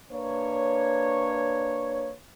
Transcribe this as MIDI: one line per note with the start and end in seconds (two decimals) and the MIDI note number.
0.11 2.11 58
0.11 2.11 62
0.11 2.11 71
0.11 2.11 73